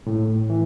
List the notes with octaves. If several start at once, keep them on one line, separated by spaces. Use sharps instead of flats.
A2
E3